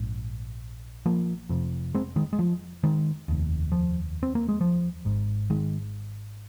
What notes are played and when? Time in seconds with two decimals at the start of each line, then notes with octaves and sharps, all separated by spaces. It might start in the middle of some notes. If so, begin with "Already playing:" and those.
Already playing: A#1 G#2
1.06 F3 A#3
1.49 F1 F2 C3
1.94 G#3 C4
2.16 D#3 G#3
2.33 G#3
2.39 F3
2.83 D#3 G#3
3.28 F1 D#2
3.72 F3
4.23 C4
4.35 A#3
4.49 G#3
4.61 F3
5.05 G#1 G#2
5.50 D#3 G#3